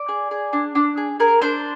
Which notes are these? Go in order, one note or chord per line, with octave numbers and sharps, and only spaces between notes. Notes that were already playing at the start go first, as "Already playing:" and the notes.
Already playing: D5
G#4
G#4
D4
D4
G#4
G#4 A#4
D4 C5